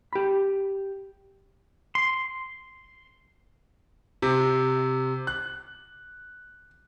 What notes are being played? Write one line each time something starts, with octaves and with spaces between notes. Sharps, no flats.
G4 B5
C6
C3
F#6